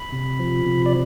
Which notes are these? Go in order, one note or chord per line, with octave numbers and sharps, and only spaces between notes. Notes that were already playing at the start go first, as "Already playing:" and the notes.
Already playing: B5
C3
F3
C3
D5